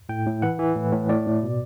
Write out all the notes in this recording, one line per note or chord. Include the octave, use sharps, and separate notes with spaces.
A2 G5
A2
E3 F#5
E3
A2
A2
A2 D5
A2
B2